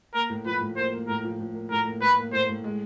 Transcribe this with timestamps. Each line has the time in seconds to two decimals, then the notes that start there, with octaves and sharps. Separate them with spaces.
0.14 A#3 A#4
0.30 A2
0.46 F3 B4
0.61 A2
0.76 A#3 C5
0.93 A#3
1.08 A2 A#4
1.24 F3
1.39 A2
1.55 A#3
1.71 A2 A#4
1.86 A#3
2.01 A2 B4
2.17 A#3
2.33 A2 C5
2.49 A2
2.64 G#3